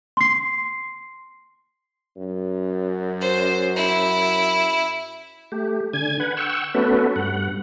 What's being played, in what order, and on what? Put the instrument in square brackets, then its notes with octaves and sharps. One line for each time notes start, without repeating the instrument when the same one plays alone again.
[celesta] C6 C7
[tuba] F#2
[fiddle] C5
E4
[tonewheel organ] A3 G4
D3 G#5 G#6
B4 F#5
F#5 G5 C#6 E6
A3 B3 C#4 F#4 A4 B4
G2 F#5